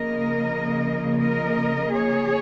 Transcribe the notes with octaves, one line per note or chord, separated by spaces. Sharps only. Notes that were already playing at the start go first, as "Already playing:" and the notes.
Already playing: C#3 F3 A#3 A#4 D#5
A#4 D#5
G#4 C#5